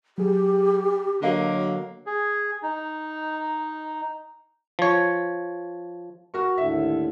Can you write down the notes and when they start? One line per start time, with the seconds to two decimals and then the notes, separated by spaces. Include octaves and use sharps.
0.18 F#3 G4 G#4
1.22 D3 F#3 A#3 A4 D#5 F5
2.06 G#4
2.63 D#4
4.79 F3 C#5
6.34 F#4 A#4 C#6
6.57 D#2 A2 D3 E5